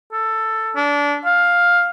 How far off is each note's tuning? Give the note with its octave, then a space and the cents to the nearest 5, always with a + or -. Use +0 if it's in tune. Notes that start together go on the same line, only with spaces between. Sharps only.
A4 +10
D4 -25
F5 +10